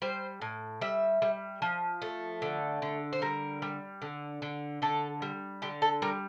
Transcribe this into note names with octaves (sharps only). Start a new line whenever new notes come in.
G3 C5
A2
G3 E5
G3
F3
A3
D3
D3
C5
G3 A#4
G3
D3
D3
D3 A4
G3
D3 G4
A4
G3 A#4